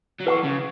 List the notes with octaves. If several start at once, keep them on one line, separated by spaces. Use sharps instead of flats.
F#3
E3 B4 F#5 C#6
C#3